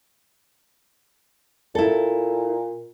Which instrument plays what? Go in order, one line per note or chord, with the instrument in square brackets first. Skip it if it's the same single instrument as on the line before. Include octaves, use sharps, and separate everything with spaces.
[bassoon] A#2 [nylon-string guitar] E4 A4